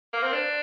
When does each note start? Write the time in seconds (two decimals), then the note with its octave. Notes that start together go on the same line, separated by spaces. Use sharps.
0.13 A#3
0.23 C4
0.33 D4